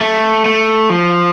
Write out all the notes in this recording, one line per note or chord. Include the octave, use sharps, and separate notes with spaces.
A3
A3
F3